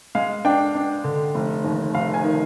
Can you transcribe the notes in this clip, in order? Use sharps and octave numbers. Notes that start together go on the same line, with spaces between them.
G#3 F5
D4 G5
D4
D3
F1
D#2
F1 F5
G#5
D#3